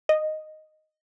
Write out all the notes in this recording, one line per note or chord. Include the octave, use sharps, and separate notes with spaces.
D#5